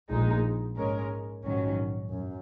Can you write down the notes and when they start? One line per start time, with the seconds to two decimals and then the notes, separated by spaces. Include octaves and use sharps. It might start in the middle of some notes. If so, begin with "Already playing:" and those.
0.10 A#1 A#2 G#3 D#4
0.77 G#2 G#3 C#4 A#4
1.45 A#1 G#2 D#3 F#3 C#4
2.12 F#2